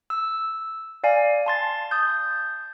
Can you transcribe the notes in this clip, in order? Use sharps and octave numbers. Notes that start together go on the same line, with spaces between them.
E6
D5 F5 G#5
A5 C6 A6
D#6 G6